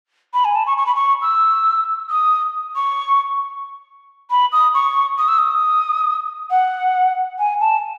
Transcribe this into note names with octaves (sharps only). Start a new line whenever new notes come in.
B5
G#5
A5
C#6
C#6
B5
C#6
E6
D#6
C#6
B5
D#6
C#6
D#6
E6
D#6
F#5
G#5
A5